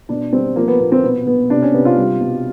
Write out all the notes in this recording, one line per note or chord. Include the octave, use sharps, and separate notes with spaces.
B2 D4
G3 C4
F3 A#3
B3
A#2 B3
C4
B2 B3
B2 B3
C3 D4
C#4
C3 B3
F4
G3
B2